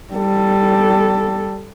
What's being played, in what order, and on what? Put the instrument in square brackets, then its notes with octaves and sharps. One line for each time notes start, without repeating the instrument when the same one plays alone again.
[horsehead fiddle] G3 A4